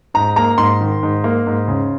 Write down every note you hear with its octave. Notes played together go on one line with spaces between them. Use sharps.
G#2 A#5
A#3 A#5
G#2 C6
D#3
G#2
A#3
G#2
C#3